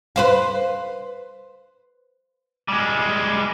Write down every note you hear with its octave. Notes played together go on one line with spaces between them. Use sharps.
B4 C5 F5
G3 G#3